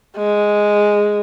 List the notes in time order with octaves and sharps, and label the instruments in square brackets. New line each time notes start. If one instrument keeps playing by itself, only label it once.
[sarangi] G#3